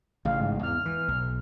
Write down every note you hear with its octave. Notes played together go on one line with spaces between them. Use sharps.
A1 C#3 F5
G#2
E2 F6
E3
B1